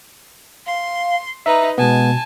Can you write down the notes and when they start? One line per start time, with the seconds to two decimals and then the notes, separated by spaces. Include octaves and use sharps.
0.66 F5 C6
1.46 D#4 B4 E5 A#5
1.78 B2 G#3 B3 G#5 A5